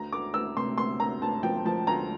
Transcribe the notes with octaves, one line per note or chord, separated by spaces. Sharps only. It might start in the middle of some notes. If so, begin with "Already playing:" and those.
Already playing: D2 A#5
D2 D6
D2 E6
C3 C6
D2 C6
D2 A#5
D2 A5
F3 G5
F3 A5
D2 A#5